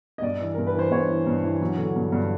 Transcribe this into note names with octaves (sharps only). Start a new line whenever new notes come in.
D#5
G2 D5
E3
G2 A#4
B4
E3 C5
G2 C#5
E3
G2
E3
F#3
D3
G2
G2